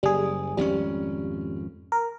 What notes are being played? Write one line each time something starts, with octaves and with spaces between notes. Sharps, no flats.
F#1 G3 G#4
G#1 F2 G3 C#4
A#4